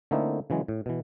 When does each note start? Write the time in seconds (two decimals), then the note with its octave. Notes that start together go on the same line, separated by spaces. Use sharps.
0.11 D3 A3 A#3 C4 D#4 E4
0.50 C#3 E3 F#3 G#3
0.68 A2
0.86 B2 E3